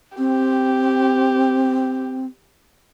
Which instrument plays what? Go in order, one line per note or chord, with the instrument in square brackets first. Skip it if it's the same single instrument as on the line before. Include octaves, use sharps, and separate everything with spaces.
[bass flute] C4 [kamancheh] G4